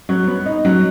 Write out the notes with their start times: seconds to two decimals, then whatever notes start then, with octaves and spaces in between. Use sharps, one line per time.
0.09 F#3
0.27 B3
0.46 D#4
0.65 F#3